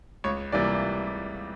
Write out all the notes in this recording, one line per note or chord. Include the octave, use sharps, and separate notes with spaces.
C#2 C#5
C3 E3 G3 A#3 D5